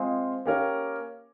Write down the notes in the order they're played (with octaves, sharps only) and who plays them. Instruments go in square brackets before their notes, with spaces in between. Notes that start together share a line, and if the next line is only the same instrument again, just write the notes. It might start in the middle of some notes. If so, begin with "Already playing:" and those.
Already playing: [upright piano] G#3 C4 F4 G#4
A#3 C#4 G4 A#4